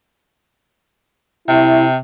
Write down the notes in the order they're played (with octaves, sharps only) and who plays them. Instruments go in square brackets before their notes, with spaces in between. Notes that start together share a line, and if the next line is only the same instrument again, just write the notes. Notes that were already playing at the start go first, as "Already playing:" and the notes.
[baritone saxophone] C3 [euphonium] E4